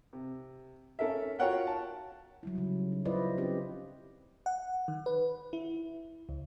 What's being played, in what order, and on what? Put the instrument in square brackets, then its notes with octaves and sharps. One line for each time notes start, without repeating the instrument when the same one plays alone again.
[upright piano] C3
C#4 A4 A#4 E5
F4 F#4 A#4 C#5 F#5 G5
A5
[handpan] F#3 G3 E4
C#3 F3 G3
D#4
E4 F4 B4 C5 D5 D#5
C4 C#4 G4 B4
[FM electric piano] F#5
D#3
B4
E4
C#2